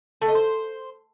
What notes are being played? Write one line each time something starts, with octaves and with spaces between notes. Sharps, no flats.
A3
D#5
C5